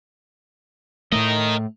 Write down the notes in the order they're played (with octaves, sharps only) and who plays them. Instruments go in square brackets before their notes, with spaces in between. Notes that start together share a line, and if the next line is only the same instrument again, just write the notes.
[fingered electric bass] A2 A3 [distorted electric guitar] A#4 D#5